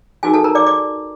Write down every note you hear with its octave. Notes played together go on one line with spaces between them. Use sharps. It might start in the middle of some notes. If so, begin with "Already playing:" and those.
D#4 F#4 G#4 A#4 G#5
A4 A5
A#4 A#5
D5 D6
D5 D6